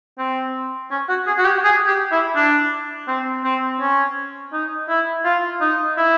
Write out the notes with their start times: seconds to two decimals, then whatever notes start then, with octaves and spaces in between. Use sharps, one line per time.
0.19 C4
0.91 C#4
1.09 F#4
1.27 G#4
1.38 F#4
1.45 G4
1.64 G#4
1.87 G4
2.12 E4
2.36 D4
3.08 C4
3.44 C4
3.81 C#4
4.53 D#4
4.89 E4
5.25 F4
5.61 D#4
5.97 E4